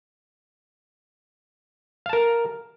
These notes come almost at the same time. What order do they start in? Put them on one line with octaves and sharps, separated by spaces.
F5 A5 A#4